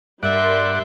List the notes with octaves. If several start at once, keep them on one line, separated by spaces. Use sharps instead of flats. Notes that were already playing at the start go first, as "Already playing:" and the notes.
G2 G3 A#4 D5 E5 F#5 C6